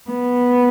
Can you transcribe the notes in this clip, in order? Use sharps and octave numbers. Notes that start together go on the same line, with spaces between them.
B3